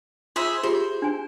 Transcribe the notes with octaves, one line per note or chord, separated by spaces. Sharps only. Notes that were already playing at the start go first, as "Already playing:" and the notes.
F4 G#4 C5 E5
F4 G4 G#4 C5
D4 G#5